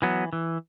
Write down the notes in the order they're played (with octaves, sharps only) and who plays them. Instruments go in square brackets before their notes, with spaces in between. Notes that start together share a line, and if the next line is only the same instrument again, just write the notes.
[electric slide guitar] E3 F#3 B3
E3